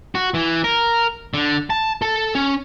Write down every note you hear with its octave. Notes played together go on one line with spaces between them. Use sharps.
F#4
E3
A#4
D3
A5
A4
C#4